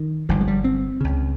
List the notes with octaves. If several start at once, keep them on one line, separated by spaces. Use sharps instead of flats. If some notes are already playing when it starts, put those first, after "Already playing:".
Already playing: D#3
G1 G2 F3
G#3
G3
C4
C#2 C#3